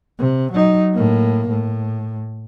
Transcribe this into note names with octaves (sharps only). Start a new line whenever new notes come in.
C3
F#3 D#4
A2 A#3
A2